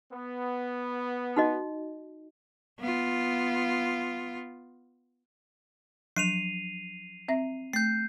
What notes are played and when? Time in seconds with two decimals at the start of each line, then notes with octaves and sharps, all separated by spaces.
0.13 B3
1.36 D#4 F#4 D#5
2.80 B3 F4
6.16 F3 F#3 D4 C7 D#7 F7
7.28 C4 E5 A#6
7.73 A3 G6 C7